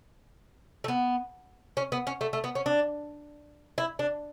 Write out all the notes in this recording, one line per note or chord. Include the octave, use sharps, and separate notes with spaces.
A3
B3
C#4
B3
C#4
A3
A3
B3
C#4
D4
E4
D4